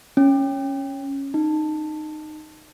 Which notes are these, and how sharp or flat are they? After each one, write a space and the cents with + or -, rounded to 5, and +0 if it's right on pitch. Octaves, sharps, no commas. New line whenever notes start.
C#4 -5
D#4 -15